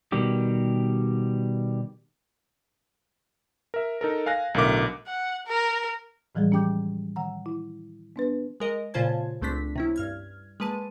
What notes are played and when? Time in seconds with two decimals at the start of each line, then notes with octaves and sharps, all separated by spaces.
0.12 B2 D#3 G3 G4
3.74 A#4 E5
4.01 D#4 A4 A#4
4.26 F5 G#5 F#6 A#6
4.54 B1 A2 D3 A#4 E5 D6
5.07 F#5
5.47 A#4
6.35 A2 E3 F3 G3 G#3 G#4
6.52 C#4 G4 G5 D6 G6
7.16 D#3 F#5 A#5
7.46 E4
8.16 B3 D4 B4
8.60 G#3 A#4 D#5
8.94 A#2 C#3 F4 C5 A5 G#6
9.42 C#2 A3 C4 D4 B6
9.76 C3 C#4 E4
9.96 G2 F6 G#6
10.60 G#3 A#3 B4 A5 D#7